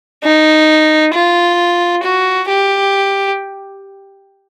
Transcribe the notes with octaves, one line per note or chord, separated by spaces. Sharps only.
D#4
F4
F#4
G4